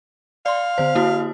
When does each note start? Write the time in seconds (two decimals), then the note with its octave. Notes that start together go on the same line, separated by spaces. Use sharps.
0.46 D5 F5 C6
0.78 D3 C5
0.95 A#3 E4 F#4